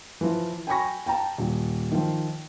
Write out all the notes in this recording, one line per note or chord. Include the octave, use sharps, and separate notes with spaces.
E3 F3
G5 G#5 B5 C#6 A#6
G5 A5 A#5
D#1
D#3 F3